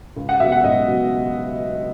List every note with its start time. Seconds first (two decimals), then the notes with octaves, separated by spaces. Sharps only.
0.16 C#2
0.29 F#5
0.40 B2 F#3 E5
0.52 F#5
0.64 C#2 D#5
0.88 B2 F#3